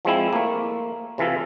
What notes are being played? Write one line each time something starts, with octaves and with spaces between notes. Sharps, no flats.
F3 G#3 C4 E4
A3 A#3
C3 E3 F4 A4